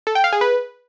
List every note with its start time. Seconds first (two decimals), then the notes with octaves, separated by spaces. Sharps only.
0.07 A4
0.15 G5
0.24 F5
0.33 G#4
0.41 B4